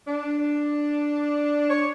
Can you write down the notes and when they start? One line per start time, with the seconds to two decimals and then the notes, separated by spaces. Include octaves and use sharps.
0.08 D4
1.70 C#5